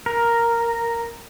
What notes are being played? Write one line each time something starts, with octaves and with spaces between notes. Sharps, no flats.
A#4